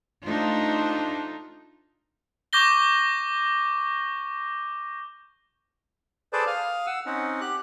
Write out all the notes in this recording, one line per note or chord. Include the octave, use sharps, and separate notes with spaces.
A3 D4 D#4 F4 C5
C#6 D6 G6 A#6 G7
G#4 A4 B4 C5 D5 A5
F5 D#6 F6
F#5 E6
C4 C#4 D#4 F#5
G4 F#6